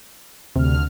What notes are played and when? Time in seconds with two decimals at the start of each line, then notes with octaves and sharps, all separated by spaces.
0.56 D2 C3 F6